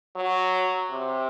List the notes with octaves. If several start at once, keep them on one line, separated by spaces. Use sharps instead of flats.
F#3
C3